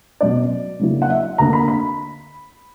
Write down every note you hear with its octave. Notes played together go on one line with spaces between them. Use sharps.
B2 F#3 C#4 D5
C#3 F#3 A#3 E4
F#5
E5
D2 D3 A#3 A#5
B5
B5